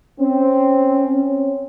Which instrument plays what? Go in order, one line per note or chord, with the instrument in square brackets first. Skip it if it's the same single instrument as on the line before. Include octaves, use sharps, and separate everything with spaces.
[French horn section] C4 [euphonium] C#4